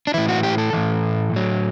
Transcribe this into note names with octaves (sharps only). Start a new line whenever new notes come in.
D4
A2 E3 E4
F#4
G4
A4
A2 E3
A2 F#3